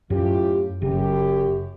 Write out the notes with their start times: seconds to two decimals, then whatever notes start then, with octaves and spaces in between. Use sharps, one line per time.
0.10 F#2 A2 C#4 F4 G4
0.82 F#1 F#2 C#3 G4